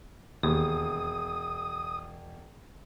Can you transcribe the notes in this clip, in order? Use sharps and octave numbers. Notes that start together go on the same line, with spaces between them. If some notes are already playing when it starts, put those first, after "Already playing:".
E1 D#2 D#6